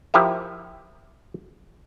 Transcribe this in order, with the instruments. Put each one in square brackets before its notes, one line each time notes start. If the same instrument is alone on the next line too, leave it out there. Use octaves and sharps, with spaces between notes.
[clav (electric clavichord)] F3 E4 G4 A#4 E5